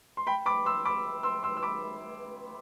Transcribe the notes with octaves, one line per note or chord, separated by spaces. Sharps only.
C6
G5 B5
B5 D6
C6 E6
B5 D6
C6 E6
C6 E6
E6
B5 D6